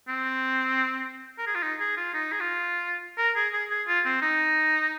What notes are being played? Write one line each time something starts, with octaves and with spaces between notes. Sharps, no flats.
C4
A#4
G#4
F4
D#4
G#4
F4
D#4
G#4
F4
A#4
G#4
G#4
G#4
F4
C4
D#4